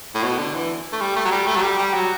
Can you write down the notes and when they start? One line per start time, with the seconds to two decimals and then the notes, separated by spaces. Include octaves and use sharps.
0.15 A2
0.23 B2
0.38 D3
0.54 E3
0.93 A3
1.01 G3
1.16 A3
1.25 F#3
1.32 G3
1.47 A3
1.56 F#3
1.63 G3
1.79 G3
1.94 F#3